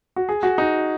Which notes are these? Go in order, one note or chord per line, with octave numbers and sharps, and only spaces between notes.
F#4
G#4
F#4
D#4